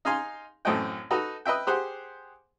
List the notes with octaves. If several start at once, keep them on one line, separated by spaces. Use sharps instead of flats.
D#4 F5 G#5 C6
A1 F#2 A3 C4 D#5 G5
D#4 F#4 A4 B4
B4 D#5 E5 G5
G4 G#4 C5 F#5 C6